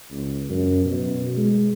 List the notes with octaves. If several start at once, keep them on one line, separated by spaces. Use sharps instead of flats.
C#2
F#2
B2
G#3